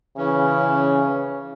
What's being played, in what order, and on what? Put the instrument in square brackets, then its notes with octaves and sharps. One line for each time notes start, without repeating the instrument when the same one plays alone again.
[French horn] C#3 [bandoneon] E3 C#4